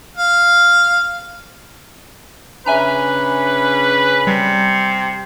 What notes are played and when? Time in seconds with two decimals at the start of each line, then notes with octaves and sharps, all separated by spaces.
0.17 F5
2.66 C#3 C#4 D4 B4 E5 G#5 A#5
4.27 C3 G3